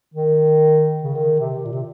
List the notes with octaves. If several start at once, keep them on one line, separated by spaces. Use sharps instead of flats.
D#3
C#3
D#3
C3
A#2
C3